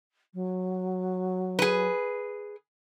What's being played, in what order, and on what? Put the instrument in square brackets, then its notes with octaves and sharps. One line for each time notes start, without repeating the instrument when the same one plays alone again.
[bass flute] F#3
[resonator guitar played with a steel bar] G#4 B4